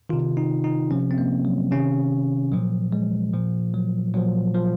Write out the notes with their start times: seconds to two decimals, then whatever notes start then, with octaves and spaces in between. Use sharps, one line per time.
0.09 C3 D#3 F4
0.37 D#4
0.64 D#4
0.91 C3 F3 C#4
1.11 C4
1.18 A#3
1.45 F#3
1.71 C3 D#3 C#4
2.52 A#2 F3 F#3
2.92 G#3
3.33 A#2 F3
3.74 F#3
4.14 A#2 F3 F#3
4.55 F3